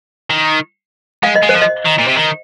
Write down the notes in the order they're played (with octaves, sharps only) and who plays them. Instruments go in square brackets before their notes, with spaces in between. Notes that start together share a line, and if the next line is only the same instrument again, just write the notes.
[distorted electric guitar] D#3
[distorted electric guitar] G#3 [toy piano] F5
[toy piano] D#5
[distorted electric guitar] G#3
[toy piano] C5
[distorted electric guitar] F3
[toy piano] D#5
[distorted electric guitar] D#3
A#2
C3
D#3